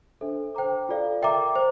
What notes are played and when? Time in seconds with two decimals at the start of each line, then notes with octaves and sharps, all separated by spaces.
0.21 D4 A4 C5 E5
0.55 C5 G5 A#5 D6
0.89 F4 A4 D5 F5
1.22 A#4 E5 G5 A#5 D6
1.56 C5